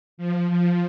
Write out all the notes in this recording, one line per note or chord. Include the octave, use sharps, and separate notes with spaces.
F3
F3